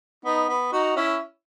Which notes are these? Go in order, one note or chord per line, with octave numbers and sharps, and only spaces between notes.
B3 D#4
B3
D#4 F#4
C#4 E4